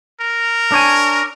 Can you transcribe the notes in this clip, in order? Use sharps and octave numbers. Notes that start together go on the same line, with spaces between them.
A#4
D4 C#5 G#5